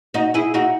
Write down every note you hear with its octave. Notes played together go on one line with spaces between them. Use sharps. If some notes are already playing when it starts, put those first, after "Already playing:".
D#4 F#4
E4 G#4
D#4 F#4